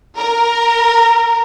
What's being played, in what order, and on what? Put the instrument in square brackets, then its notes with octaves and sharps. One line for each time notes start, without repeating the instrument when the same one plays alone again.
[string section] A#4